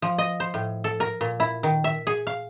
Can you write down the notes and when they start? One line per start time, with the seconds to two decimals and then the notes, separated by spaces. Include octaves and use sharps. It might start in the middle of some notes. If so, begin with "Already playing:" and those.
0.02 F3
0.18 D#5
0.40 C5
0.54 A2
0.84 A4
1.00 A#4
1.21 A#2
1.40 E4
1.63 D#3
1.84 E5
2.07 G#4
2.27 F5